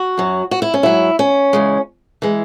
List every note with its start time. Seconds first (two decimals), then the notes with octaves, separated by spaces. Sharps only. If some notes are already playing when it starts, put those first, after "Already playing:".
Already playing: F#4
0.18 F#2 F#3
0.51 F#4
0.62 E4
0.74 C#4
0.83 G#2 F#3 E4
1.19 C#4
1.53 E2 C#3 G#3
2.22 E3 G#3